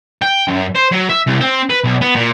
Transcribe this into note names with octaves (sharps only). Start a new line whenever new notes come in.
G5
F#2
C5
F#3
E5
C2
C4
B4
B1
B3
A#2